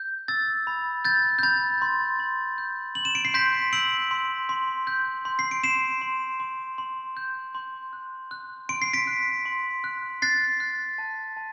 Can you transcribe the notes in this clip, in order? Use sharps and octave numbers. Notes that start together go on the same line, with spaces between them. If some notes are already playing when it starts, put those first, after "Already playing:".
Already playing: G6
E6 A6
B5
G6 A6
G6
B5 A6
C6
C6
G6
C6 F#7
E7
D7
C7
C6 G6 B6
E6 D7 F#7
C6
C6
G6
C6
C7
D7
C6 C7 E7
C6
C6
C6
G6
C6
F#6
F#6
C6 D7
C7
B6 D7
F#6
C6
F#6
F#6 A6 C7
F#6
A5
A5